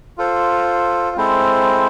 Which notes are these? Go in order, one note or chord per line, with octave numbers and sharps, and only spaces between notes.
F4 A4 C5
G#3 C4 E4 A4 C5